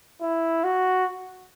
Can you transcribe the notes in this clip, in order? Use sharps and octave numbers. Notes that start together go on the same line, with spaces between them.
E4
F#4